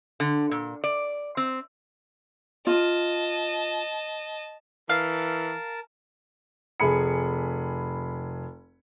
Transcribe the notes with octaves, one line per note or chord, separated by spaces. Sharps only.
D3
A#2
D5
C4
F4 D#5 A5
E3 A#4 F5 A5
F1 G#4 B5 C#7